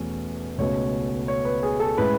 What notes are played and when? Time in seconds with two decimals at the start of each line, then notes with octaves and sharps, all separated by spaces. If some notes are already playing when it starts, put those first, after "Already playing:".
Already playing: E2 B2 A3 C#4
0.58 C#2 B2 A3 C#4 C#5
1.28 C#5
1.45 B4
1.63 G#4
1.80 A4
1.98 A2 G#3 C#4 B4